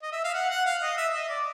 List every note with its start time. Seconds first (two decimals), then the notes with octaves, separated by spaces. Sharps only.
0.02 D#5
0.12 E5
0.24 F5
0.34 F#5
0.50 F#5
0.66 F5
0.82 D#5
0.97 E5
1.14 D#5
1.29 D5